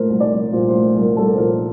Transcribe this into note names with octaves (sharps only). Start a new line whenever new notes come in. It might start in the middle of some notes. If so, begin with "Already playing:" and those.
Already playing: A#2 A3 A#4 C5
C2
D5
C2
A#2 C5
C5
A3
C2
A#4
C2 A4
C5
A#2 A#4